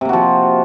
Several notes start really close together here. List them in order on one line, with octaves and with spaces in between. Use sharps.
C3 A#3 F#4 F3